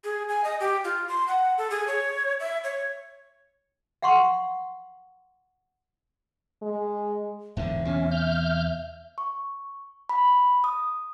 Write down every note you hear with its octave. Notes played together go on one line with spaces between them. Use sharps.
G#4
G#5
D#5
G4
F4
C6
F#5
A4
G#4
C#5
E5
C#5
F5 F#5 C6 C#6
G#3
E1 G#2 D3 E5
E2 C3 C#4
F6 G6
C#6
B5
D#6